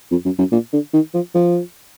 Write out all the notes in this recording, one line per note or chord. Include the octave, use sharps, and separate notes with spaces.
F2
F#2
F#2
A#2
D3
D#3
F3
F3